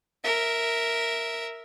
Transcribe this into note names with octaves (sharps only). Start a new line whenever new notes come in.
A#4 E5